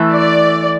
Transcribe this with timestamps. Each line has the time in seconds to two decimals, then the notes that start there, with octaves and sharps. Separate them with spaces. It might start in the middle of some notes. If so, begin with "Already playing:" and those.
Already playing: E3 A3
0.11 D5